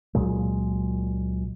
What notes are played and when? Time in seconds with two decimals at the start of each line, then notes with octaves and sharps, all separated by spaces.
0.15 C#2 A#2 F#3 G#3